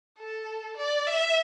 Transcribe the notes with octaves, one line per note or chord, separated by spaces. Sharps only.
A4
D5
E5